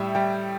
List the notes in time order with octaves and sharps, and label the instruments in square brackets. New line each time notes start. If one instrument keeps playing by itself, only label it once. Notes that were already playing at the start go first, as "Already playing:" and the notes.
Already playing: [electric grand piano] A2 G3 E5 G5
G3 G5